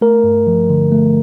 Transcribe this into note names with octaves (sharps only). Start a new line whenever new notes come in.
A3 A#4
G2
F3
D3
A3